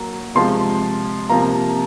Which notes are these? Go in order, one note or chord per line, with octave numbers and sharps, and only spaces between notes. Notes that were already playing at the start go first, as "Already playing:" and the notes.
Already playing: F#3 A#3 A#5
C3 F3 G#3 C6
C3 F3 A#3 A#5